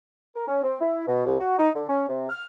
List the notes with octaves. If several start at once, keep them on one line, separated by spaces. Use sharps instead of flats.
A#4
C#4
C4
E4
B2
C2
F#4
D#4
D3
C#4
C3
F6